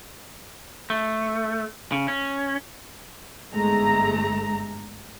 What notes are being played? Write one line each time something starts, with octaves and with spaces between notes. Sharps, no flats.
A3
C#3
C#4
G1 G#2 G#3 A3 A#5